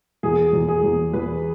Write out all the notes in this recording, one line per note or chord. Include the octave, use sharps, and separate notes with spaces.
E2 G#4
E2
G#4
E2
E2 B4